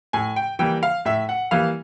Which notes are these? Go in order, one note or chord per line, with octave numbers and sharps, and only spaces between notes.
A2 G#5
G5
E3 G3 A#3 G5
F5
A2 E5
F#5
E3 G3 A#3 F5